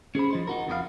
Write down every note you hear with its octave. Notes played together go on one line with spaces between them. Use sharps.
C#4 G#4 C5 B5
F3 D#4 C5
D#4 F#4 A#4
F2 B3 G4 F5